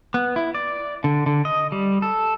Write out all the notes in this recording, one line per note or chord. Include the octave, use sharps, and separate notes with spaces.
B3
E4
D5
D3
D3
D#5
G3
A4